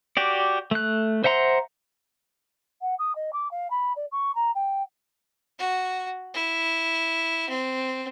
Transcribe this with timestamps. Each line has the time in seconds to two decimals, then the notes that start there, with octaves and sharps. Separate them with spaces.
0.17 F#4 G4 D5
0.71 A3 F#6
1.24 C5 E5 F#5 A#5 C6
2.81 F#5
2.99 D#6
3.15 D#5
3.33 D6
3.51 F5
3.70 B5
3.96 D5
4.12 C#6
4.35 A#5
4.55 G5
5.59 F#4
6.34 E4
7.49 C4